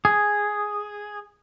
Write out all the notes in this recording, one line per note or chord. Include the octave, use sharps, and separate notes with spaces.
G#4